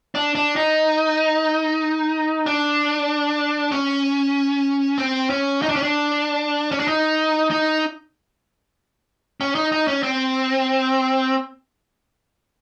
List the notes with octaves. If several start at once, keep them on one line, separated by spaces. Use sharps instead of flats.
D4
D4
D#4
D4
C#4
C4
C#4
D#4
D4
C#4
D4
C#4
D4
D#4
D#4
C#4
D#4
D#4
C#4
C4